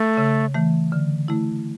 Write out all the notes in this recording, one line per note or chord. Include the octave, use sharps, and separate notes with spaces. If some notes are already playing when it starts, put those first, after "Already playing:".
Already playing: A3
C#3
E3 A3
D3
A3 E4